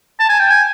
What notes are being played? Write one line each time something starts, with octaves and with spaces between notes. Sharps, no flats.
A5
G#5
G5
G#5